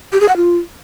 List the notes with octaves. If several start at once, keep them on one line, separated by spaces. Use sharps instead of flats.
G4
G#4
F#5
F4